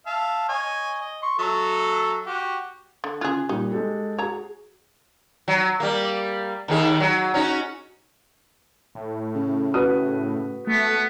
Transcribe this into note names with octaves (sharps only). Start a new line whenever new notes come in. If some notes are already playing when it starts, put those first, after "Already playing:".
E5 F5 A5
C#5 D#5 G#5
D#5
C6 C#6
F#3 A4 E5
F#4 G4
D3
C#3 F4 G#4 F#6 G#6
A#2 G3 D#4
G#3 G4 A4
F#4 G#4 C#5 A#5
F#3
G3 A#3
D#2 D#3 G#4
F#3
C#4 D#4 F#4
A2
C#3
F#4 B4 D#6
A3 B3